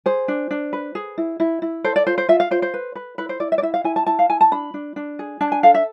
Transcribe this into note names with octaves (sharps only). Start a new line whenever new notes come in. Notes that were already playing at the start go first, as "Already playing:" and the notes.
G#4 C5
D4
D4
B4
G#4
E4
E4
E4
A4 C5
D5
F4 C5
C5
F4 E5
F5
F4 C5
C5
B4
B4
E4 B4
C5
E4 D5
E5
D5
E4 E5
F5
E4 G#5
A5
E4 A5
F5
E4 G#5
A5
D4 B5
D4
D4
G#4
D4 A5
G#5
A4 F5
E5